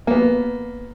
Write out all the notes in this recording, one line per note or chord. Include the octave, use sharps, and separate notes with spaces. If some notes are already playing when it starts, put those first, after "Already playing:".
A#3 B3